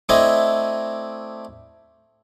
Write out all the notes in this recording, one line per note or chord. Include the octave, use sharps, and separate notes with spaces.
A3 C4 D4 E4 D#5 G#5